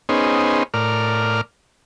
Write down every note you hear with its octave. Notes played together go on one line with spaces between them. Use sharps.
B3 C#4 D#4 G#4 C5
A2 A#4 D5 F6